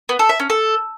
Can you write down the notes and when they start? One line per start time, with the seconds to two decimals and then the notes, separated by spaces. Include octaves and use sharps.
0.09 B3
0.19 A4
0.29 E5
0.40 C#4
0.50 A4